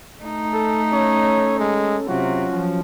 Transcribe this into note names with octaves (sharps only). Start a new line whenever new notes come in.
A3 D#4
A4
C#4 A4 C#5
G#3
C3 F#3 C#4 F4 F#4
F3